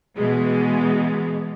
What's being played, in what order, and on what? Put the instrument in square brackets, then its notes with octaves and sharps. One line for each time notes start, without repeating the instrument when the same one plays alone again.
[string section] B2 E3 G#3